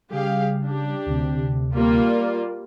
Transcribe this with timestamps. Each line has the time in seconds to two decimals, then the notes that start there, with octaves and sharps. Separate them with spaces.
0.10 C#3 G3 G4 G#4 F5
0.64 D4 G4
1.06 D2 C3
1.74 G3 A#3 F4
2.03 A#4 D5